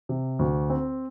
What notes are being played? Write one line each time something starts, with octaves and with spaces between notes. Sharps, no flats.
C3
D2
C4